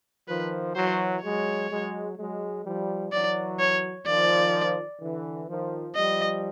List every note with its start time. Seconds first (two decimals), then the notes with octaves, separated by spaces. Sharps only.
0.28 D#3 F3 B4
0.75 E3 F#3 C5
1.22 F#3 G#3 C#5
1.69 F#3 G#3
2.17 F#3 G#3
2.65 F3 G3
3.11 E3 F#3 D5
3.59 C#5
4.06 D#3 F3 D5
5.01 D3 E3
5.48 D#3 F3
5.95 F3 G3 D#5